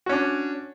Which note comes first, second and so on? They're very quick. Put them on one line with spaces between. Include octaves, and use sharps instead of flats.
F#4 C#4 D4